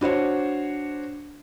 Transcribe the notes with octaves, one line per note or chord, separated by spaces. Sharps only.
D4 F#4 C5 C#5